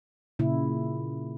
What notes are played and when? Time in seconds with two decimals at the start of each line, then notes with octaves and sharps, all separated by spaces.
0.39 A#2 C#3 E4